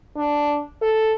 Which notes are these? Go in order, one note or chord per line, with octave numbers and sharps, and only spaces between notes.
D4
A4